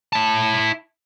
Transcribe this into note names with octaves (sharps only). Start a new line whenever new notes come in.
E4 A5